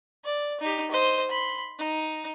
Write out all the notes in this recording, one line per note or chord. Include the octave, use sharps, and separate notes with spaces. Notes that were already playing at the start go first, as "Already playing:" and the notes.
D5
D#4 G4
C5 D#5
B5 C6
D#4